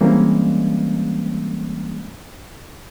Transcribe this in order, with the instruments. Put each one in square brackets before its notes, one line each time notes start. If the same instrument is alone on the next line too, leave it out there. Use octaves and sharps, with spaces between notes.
[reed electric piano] E3 G3 G#3 A#3 C4 C#4